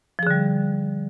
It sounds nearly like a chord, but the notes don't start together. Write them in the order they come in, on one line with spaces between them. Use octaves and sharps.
F3 G#4 D3 G3